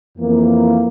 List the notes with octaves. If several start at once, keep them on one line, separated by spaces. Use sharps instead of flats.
F2 E3 A#3